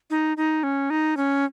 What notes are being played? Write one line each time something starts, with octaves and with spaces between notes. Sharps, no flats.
D#4
D#4
C#4
D#4
C#4